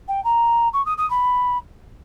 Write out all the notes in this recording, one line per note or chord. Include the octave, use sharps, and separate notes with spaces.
G5
A#5
C#6
D#6
D#6
B5